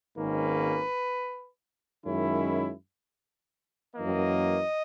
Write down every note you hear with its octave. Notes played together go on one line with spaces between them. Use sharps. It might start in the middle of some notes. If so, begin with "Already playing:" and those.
G#1 G#2 D#3 A#3 C#4 B4
F#2 D#3 G#3 C#4 E4
F#2 E3 A#3 D#5